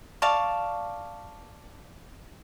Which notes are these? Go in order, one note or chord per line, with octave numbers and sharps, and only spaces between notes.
D5 F5 A5 C#6